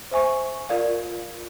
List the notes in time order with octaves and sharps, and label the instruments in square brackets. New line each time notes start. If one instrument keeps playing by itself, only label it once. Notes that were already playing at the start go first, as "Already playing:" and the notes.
[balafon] C5 E5 G#5 C#6
F4 A#4 D5 F5